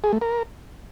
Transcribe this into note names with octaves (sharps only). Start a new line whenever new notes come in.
G#4
A3
A#4